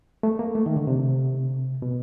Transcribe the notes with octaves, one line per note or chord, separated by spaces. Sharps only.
A3
A#3
A3
D#3
D3
C3
B2